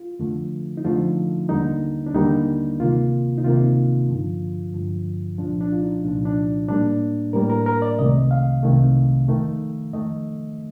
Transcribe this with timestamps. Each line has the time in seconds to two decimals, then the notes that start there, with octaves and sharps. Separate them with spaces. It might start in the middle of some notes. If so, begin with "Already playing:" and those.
Already playing: F4
0.19 F2 D3 F3 A3
0.77 D#4
0.84 F2 D3 F3 A3 F4
1.49 D#2 D3 G3 A#3 D#4
2.06 D4
2.14 D#2 D3 G3 A#3 D#4
2.79 D2 C3 D#3 A#3 F4
3.38 D#4
3.44 D2 C3 D#3 A#3 F4
4.09 G2 D3 F3
4.74 G2 D3 F3
5.38 C2 A#2 F3 D4
5.61 D4
5.72 F4
5.82 D#4
6.03 C2 A#2 F3 D4
6.25 D4
6.68 A2 G3 A#3 D4
7.33 A2 G3 A#3 A#4
7.50 A#4
7.66 A#4
7.82 D5
7.99 C2 C3 D#3 A3 D#5
8.31 F5
8.63 C2 C3 D#3 A3
9.28 F2 D#3 A3
9.93 F2 D#3 A3 D#5